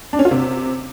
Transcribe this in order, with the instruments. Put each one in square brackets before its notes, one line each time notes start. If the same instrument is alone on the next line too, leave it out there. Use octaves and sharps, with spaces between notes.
[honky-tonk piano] D4
C#4
F4
C3